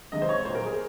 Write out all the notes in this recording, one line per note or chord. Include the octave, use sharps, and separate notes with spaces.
C3 D#3 G#3 D#5
C5
C#5
A#2 F#3 C5
A#4
G#4